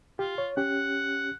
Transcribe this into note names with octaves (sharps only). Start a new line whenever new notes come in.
F4 G4
C#5
C#4 G4 F#5